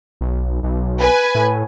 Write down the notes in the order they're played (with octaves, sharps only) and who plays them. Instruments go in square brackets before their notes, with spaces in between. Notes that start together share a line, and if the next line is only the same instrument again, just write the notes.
[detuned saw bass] B1
B1
[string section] B4 G#5
[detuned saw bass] A2